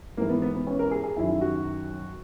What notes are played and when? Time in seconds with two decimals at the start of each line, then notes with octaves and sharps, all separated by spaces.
0.17 G#2 E3 A#3
0.29 B3
0.42 B3
0.55 B3
0.67 C#4
0.79 A#4
0.91 G#4
1.04 G#4
1.16 F#2 D#3 F#3 E4
1.41 F#4